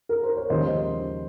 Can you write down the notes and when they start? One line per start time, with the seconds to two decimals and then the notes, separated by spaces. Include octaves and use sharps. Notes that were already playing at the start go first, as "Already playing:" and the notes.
0.09 A#4
0.23 C5
0.37 C#5
0.50 D#2 C#3 F3 G#3 C5 D#5